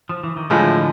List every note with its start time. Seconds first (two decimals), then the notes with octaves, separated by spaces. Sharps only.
0.09 F3
0.23 E3
0.36 D#3
0.50 A2 D3 F3 G#3